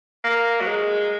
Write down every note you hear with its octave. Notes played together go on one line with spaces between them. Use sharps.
A#3
F#3
G#3